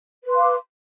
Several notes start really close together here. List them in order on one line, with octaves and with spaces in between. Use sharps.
B4 C6 F5 D6